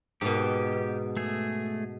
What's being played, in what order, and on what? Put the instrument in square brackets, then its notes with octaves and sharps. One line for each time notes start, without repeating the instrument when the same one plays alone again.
[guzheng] G#2 B2 [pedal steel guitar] G4
[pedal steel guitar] A3 G#4